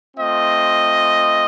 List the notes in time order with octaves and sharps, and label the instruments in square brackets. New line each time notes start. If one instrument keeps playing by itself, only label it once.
[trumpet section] A3 C4 F4 D#5